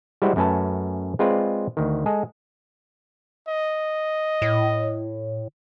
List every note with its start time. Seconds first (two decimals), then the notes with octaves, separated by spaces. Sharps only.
0.22 G3 G#3 E4 F#4 C5 F#5
0.36 F#2 A3 C#4 B4 A5
1.19 G#3 C4 F4 B4 D5
1.77 D2 D#3
2.06 G#3 G#4 A4
3.48 D#5
4.42 A2